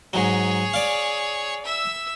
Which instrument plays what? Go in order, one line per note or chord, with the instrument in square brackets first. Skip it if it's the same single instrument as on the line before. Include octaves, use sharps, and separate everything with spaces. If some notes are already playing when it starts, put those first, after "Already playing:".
[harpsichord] G#2 F#3 [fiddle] G#4 C#5
[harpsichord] D5 F5
[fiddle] E5 E6